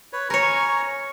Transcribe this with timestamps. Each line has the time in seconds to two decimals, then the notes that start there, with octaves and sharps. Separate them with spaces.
0.13 B4 C#5
0.30 A#4 C#5 G#5 A#5 C#6